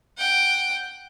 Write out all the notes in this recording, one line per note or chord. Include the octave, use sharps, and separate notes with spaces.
F#5 G5